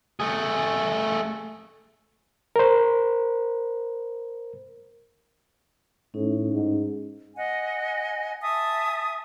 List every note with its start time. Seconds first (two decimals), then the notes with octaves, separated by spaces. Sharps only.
0.20 A3 G#4
2.56 A#4 C5
6.14 A2 C#4 D#4
6.54 G#2
7.35 D#5 F#5 G#5
8.41 E5 G#5 A5 D#6